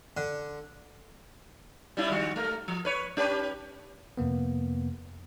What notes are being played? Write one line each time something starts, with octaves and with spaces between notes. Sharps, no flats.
D3
G3 C#4 E4
D#3 G3 F#4
A3 A#4
F3
B4 C#5
C#4 G4 B4
F2 C3 A#3 B3